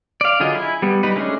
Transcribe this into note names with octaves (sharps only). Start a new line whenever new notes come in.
D5 F5
D3 F#3 F4 G#4 D#5
E4 G#5
G3 B3
G3 D#4 B4
G#3 A3 C#4 D4 G#4